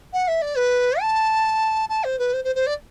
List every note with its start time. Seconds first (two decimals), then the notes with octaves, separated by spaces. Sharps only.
0.12 F#5
0.27 E5
0.41 D5
0.56 B4
1.00 A5
1.89 A5
2.03 C5
2.18 B4
2.33 C5
2.44 C5
2.55 C5
2.66 D5